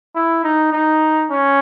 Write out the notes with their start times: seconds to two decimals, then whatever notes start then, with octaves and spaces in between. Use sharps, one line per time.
0.16 E4
0.44 D#4
0.73 D#4
1.31 C#4